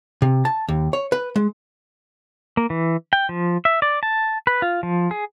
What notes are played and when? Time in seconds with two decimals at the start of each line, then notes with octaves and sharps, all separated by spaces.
0.22 C3
0.45 A5
0.68 D#2
0.93 C#5
1.12 B4
1.36 G#3
2.57 A#3
2.70 E3
3.13 G5
3.29 F3
3.65 E5
3.82 D5
4.03 A5
4.47 B4
4.62 F4
4.83 F3
5.11 G#4